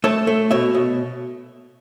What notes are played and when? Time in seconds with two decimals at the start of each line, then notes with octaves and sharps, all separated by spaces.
0.04 A3 A4 C#5
0.27 A3
0.51 B2 C#5 E5
0.74 B2